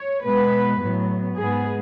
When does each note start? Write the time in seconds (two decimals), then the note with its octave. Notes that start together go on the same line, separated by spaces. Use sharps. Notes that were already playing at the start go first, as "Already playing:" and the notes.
Already playing: C#5
0.24 B2 G#3 B3 B4
0.80 A2 F#3 B3
1.37 G#2 G#3 B3 G#4